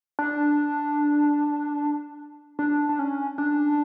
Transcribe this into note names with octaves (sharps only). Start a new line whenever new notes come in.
D4
D4
D4
C#4
D4